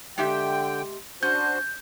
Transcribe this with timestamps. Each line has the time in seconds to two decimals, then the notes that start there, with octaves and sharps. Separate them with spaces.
0.18 D3 G#3 G4 E5 G5
1.23 C#4 D4 F#4 C5 G6